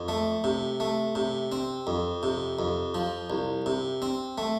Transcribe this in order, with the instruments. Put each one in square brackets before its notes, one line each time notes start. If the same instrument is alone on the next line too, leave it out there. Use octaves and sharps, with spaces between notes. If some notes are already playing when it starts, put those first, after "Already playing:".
Already playing: [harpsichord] F2
A3
C3
A3
C3
C4
F2
C3
F2
F3
C2
C3
C4
A3